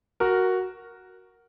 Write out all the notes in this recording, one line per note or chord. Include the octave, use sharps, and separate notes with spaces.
F#4 A#4